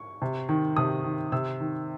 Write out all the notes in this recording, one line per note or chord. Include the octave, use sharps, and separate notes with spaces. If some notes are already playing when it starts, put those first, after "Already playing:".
Already playing: C#6
C3
D#3
C3 D#6
D#3
C3 E6
D#3